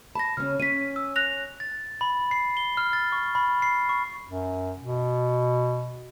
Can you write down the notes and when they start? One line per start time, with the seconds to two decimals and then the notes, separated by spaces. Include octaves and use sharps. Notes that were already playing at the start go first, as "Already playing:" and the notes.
0.15 A5 B5 A#6
0.37 C#3 C#4 F6
0.60 C#4 B6 D#7
0.96 E6
1.16 F#6 A#6 F7
1.60 A6
2.01 B5
2.31 C7
2.57 G7
2.77 F6
2.93 A6
3.12 C#6
3.35 B5
3.62 C7
3.89 C#6
4.28 F#2
4.80 B2